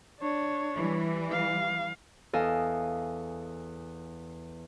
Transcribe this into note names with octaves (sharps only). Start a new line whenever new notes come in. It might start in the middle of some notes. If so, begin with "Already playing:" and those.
D4 C#5
E3 G3
F5
E2 A4 D#5 F5 G#5